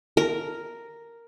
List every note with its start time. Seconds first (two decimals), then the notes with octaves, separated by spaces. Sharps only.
0.17 A#4